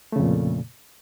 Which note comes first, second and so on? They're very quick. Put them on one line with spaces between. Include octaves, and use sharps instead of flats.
A3 C#3 F2 A#2